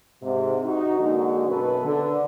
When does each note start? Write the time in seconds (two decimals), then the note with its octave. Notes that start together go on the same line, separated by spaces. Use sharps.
0.22 G#2 C3
0.65 D#4 F#4
1.00 D3 F#3 G#3 A#3 F#4
1.48 F#2 B2 A4 B4
1.84 D3